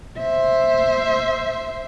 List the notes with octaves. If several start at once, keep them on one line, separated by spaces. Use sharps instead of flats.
C5 E5